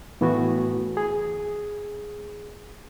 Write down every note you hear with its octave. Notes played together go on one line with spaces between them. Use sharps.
A2 E3 A3 B3 E4 F#4
G#4